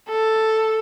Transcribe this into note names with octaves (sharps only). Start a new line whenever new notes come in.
A4